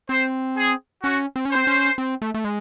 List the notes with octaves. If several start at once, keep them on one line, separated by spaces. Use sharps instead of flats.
C4 C5
G#4
C#4 F#4
C4
C#4
C4 C5
C#4
C4
A3
A3
G#3